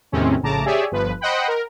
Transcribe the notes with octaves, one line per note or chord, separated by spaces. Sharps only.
E2 A2 C3 D#3 C4 C#4
A#1 A2 C#3 A5 A#5 D6
G4 G#4 C#5 D5 E5 G#5
G1 F3 B4
C5 D#5 F#5 G5 B5
A#4